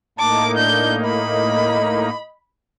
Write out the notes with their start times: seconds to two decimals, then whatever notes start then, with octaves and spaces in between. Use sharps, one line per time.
0.19 A2 A#3 D#4 A5 D6
0.56 D4 G6
1.05 D#5 B5